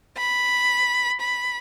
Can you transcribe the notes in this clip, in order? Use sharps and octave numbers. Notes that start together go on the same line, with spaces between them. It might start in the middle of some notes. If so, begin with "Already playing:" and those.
B5
B5